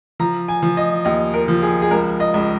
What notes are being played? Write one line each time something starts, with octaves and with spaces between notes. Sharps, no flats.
F3 A#5
G#5
F3
D#5
D#2 D#5
A#4
F3
G#4
G#4
C#2 A#4
D#5
C#2